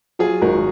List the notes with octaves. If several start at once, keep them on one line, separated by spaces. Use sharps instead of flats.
F#3 F4 G#4
G#1 F#4 A#4